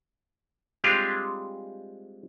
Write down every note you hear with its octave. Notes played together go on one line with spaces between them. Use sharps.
G3 G#3 C4 D4 F4 G4